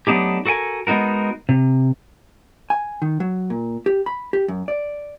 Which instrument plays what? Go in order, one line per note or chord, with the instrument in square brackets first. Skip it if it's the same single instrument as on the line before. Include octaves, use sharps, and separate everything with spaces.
[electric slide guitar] F#3 A3 B3 D4 D#4 G4
F#4 A4 A#4 G5 G#5
G#3 B3 D#4 F#4 A#4
C3
[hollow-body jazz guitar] G#5
D#3
F#3
A#2
G4
B5
G4
F#2
D5